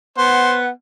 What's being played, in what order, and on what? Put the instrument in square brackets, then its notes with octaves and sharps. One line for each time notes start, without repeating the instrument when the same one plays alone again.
[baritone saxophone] B3 [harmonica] C5 [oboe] F#5